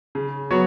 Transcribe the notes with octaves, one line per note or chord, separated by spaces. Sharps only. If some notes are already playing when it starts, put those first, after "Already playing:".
C#3
F#3 B3 F#4 C#5